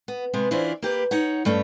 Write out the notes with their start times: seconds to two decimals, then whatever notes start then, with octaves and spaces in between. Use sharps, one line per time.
0.08 B3
0.33 C3 G#3 B3
0.51 E3 C#4 D4 E4 F4 C5
0.82 A#3 G4 B4
1.11 D#4 C#5 F#5
1.45 G2 A3 C#4